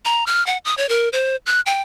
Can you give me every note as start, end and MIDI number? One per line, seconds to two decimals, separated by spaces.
0.05 0.24 82
0.27 0.45 89
0.46 0.58 78
0.65 0.75 87
0.77 0.89 73
0.89 1.09 70
1.13 1.36 72
1.46 1.61 90
1.66 1.82 79